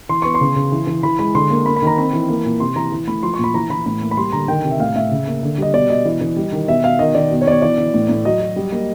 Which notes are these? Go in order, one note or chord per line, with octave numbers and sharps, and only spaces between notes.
E3 C6
B3 C#6
C6
C#3
C#3
E3
E3
E3 B5
G#3 B5
D3 C6
A#3
A#3 B5
B5
D#3 A#5
C4 B5
E3
A#3
A#2
C3 C6
E3 A#5
E3
A3 B5
F3 C6
C#6
A#2
B5
E3 A#5
E3 B5
A2 B5
A#3
B5
G3 C6
D3 A#5
D#3 G5
C3
E5
A2 F5
A2 E5
C#3
A#3
D3
G3 D#5
B2 D5
B2 D#5
E3
E3
G3
D#3
B2 E5
B2 F5
D#3 D#5
D#3 D5
B2
C#5
B2 C#5 D5
E3 D5
E3
A2
A2
F#3 D#5
F#3
G3
A#3